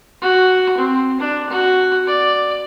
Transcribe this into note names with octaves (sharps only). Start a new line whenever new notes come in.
F#4
C4
D4
F#4
D5